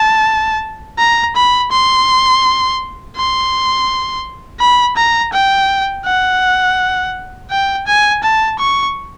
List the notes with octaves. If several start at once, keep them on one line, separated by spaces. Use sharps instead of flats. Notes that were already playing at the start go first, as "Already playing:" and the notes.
Already playing: A5
A#5
B5
C6
C6
B5
A#5
G5
F#5
G5
G#5
A5
C#6